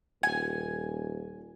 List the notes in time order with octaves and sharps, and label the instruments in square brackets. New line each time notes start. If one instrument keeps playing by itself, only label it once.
[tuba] D#1 [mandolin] G#5